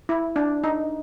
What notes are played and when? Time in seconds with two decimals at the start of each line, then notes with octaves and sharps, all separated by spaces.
0.09 E4
0.36 D4
0.64 D#4